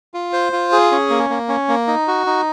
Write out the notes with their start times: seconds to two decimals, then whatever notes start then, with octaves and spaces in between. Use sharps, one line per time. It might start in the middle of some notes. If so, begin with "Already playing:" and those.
0.14 F4
0.33 C5
0.52 F4
0.72 G#4
0.92 C#4
1.10 A#3
1.30 A#3
1.49 C#4
1.68 A#3
1.87 D#4
2.08 F#4
2.27 D#4